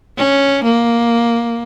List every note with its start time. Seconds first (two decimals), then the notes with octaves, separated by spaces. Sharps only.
0.17 C#4
0.64 A#3